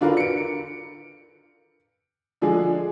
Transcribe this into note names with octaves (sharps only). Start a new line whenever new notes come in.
D3 D4 F4 F#4 A#4 B4
C#7 D7
D3 F3 G#3 D4 G#4